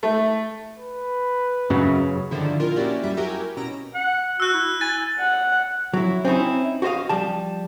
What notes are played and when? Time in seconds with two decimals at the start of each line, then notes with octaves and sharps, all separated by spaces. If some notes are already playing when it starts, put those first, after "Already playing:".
0.03 A3
0.78 B4
1.70 F#2 C#3 F#3
2.31 G2 D3 D#3 F3 E4
2.60 A#2 E4 F4 A#4
2.76 A#3 C#4 E4 F#4 G4 D5
3.03 F#2 G3 E5
3.17 E4 F#4 G4 A#4 G5 G#5
3.57 B2 C#4 A#5 E6 D7
3.95 F#5
4.40 F#4 E6 F#6
4.54 E4
4.81 G#5 A6
5.20 F#5
5.94 F#3 E4
6.25 C4 C#4 D#4 E4
6.82 F#4 G4 C5 D#5 F5
7.09 F3 G3 A5